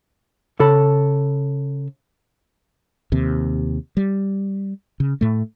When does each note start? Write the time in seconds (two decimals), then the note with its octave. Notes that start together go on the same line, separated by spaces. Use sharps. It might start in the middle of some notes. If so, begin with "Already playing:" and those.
0.60 C#3 A4 A5 B5
3.12 D#2 C3
3.97 G3
5.00 C#3
5.21 A2 A3